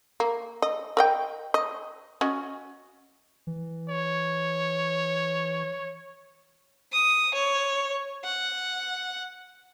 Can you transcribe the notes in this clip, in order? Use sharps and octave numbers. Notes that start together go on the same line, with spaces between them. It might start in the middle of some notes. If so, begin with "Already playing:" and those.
A#3
D#5
A#4 D#5 G5
D#5
C#4 F#4 D#5
E3
C#5
D#6
C#5
F#5